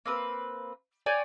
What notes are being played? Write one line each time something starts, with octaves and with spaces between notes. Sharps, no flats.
A#3 C4 B4
C#5 D5 G5 G#5